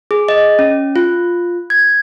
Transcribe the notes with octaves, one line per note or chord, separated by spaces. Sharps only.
G#4
D#5
C#4
F4
G#6